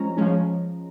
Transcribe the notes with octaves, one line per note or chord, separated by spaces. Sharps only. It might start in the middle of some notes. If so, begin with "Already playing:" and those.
Already playing: F3 G#3 C#4 A#5
F3 G#3 C#4